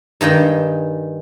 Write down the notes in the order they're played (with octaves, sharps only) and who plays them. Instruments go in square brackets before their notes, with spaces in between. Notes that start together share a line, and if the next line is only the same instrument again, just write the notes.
[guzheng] G2 D#3 G#4 G5